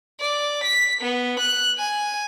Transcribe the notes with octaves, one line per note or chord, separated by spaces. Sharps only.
D5
B6
B3
F#6
G#5